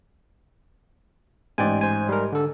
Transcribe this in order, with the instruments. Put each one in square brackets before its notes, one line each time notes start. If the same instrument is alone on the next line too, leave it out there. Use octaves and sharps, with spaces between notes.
[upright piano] A1 G#2 [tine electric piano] D5 G5 G#5
[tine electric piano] C5 G#5
G3 A#4
D3 A4